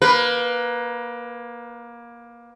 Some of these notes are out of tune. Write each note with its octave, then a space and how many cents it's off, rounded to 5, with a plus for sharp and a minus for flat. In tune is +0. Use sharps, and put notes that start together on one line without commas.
A#3 +20 B4 +0